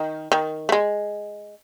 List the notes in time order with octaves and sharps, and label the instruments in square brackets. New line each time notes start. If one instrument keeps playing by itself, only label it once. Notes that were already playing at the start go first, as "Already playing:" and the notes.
Already playing: [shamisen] D#3
D#3
A3
G#3